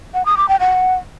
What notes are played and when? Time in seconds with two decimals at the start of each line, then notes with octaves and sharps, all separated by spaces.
0.14 F#5
0.26 D#6
0.37 D6
0.49 G5
0.60 F#5